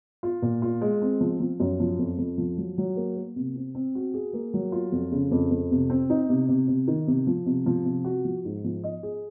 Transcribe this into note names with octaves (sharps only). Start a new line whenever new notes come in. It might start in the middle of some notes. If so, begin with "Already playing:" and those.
F4
A#2
F4
G#3
C4
F3
F3
F#2
F3
F2
F2
F3
F#3
F#3
A#3
A#3
C3
C4
C4
F#4
G#4
A#3
F#3
F4
F2
C#3
F2
F2
C3
C4
D#4
C3
C3
C3
D#3
C3
F3
C3
F3
C3
F#4
F3
G#2
F3
D#5
G#4